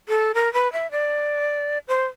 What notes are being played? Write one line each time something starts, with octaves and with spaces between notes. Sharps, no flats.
A4
A#4
B4
E5
D5
C5